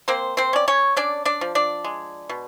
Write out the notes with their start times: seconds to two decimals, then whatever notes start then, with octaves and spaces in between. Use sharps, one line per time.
0.08 A#3 C4 C5
0.37 C4 C5
0.53 C#4 D5
0.68 C#4 C#5
0.96 C#4 D4 D5
1.25 D4 D5
1.41 F3
1.55 D4 D5
1.84 G#3
2.29 B2